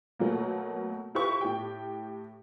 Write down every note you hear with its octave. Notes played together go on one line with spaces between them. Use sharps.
B2 F#3 A3 A#3
E4 F4 G4 B4 C5 C#6
A2 G4 G5